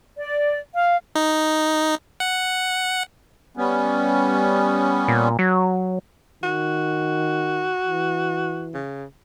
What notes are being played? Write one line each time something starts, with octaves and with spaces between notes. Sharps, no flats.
D5
F5
D#4
F#5
G3 B3 C#4
A#2
F#3
D#3 F#4
E3
C#3